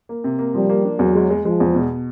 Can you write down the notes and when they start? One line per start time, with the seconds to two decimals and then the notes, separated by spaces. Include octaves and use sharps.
0.09 A#3
0.24 C3
0.39 A#3
0.54 F3 G3
0.69 A#3
0.85 D4
0.99 E2 F#3
1.15 G#3
1.30 G#3
1.45 F3 G#3
1.60 E2
1.75 B2